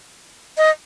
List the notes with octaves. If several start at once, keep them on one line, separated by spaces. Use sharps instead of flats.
D#5